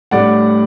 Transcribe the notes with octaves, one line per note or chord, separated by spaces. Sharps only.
A2 G3 D4 D5 F#5